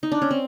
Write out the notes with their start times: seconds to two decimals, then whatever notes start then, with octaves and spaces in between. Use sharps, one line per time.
0.03 D#4
0.12 D4
0.22 C#4
0.31 C4